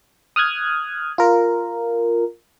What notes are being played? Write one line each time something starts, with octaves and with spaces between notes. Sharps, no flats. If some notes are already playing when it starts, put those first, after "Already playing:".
D#6 F6 F#6 G#6
F4 A#4